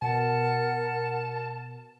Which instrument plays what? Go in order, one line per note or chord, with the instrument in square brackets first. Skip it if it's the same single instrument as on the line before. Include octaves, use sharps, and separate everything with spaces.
[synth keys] B2 [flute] A#4 [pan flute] F#5 [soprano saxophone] A5